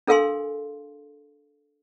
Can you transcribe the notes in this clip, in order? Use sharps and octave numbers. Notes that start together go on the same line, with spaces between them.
D4 A4 A#4 F5 G#5 C6